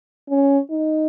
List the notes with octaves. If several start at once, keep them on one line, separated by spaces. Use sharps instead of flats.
C#4
D#4